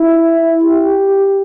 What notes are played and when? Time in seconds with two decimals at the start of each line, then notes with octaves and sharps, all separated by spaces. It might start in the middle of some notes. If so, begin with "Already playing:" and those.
Already playing: E4
0.63 G4